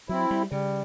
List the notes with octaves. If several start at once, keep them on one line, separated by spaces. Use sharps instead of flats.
F#3 C4 E4
G3
C#3 G3